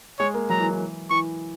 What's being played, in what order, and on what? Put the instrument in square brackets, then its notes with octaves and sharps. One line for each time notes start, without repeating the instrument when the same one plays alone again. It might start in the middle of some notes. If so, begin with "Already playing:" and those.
[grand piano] G#3 [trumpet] C#5
[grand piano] A#3
[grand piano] F#3 [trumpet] A#5
[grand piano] E3
E3
[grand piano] E3 [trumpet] C#6